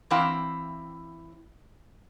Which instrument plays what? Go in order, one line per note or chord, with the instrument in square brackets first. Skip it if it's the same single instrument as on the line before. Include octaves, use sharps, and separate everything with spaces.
[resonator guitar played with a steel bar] E3 C4 E4 F5 G5